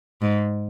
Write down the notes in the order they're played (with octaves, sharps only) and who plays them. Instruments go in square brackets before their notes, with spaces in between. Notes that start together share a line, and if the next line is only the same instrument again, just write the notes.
[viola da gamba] G#2